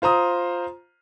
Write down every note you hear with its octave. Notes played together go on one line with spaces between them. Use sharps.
F4 C5 A#5 D#6